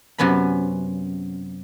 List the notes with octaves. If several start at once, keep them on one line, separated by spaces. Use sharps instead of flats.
F#2 C3 B3 C#4 B5